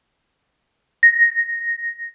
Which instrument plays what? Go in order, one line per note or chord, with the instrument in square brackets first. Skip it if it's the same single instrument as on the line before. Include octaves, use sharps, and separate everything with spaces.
[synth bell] A#6